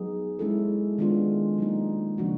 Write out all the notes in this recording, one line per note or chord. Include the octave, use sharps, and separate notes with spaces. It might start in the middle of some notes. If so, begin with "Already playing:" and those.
Already playing: F#3 B3 D#4 G#4
G#3 C#4 E4 A4
D#3 G#3 B3 D4 F4
F#3 A#3 D#4
C#3 F3 A#3 D4 F#4